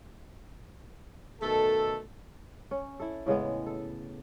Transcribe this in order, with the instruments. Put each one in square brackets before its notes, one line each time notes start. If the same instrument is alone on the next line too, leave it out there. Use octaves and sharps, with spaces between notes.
[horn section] B2 D#3 A3 A4
[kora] C#4
E4 A4
A2 C#3 G#3 B3
A4